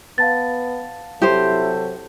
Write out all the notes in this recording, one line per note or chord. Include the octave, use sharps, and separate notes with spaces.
B3 F5 A5 A6
C3 F#3 E4 G4 A4 C5